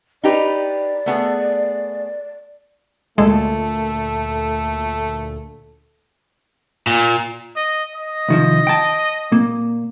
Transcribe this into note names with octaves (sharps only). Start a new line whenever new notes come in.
D#4 G4 B4 D5
A3 B3 G#4
D2 A#2 G#3 A3 A4
A#2
D#5
D#5
C2 D#3 F3
G5 A5
A#2 A#3